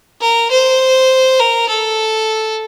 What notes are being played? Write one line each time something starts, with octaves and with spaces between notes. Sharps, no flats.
A#4
C5
A#4
A4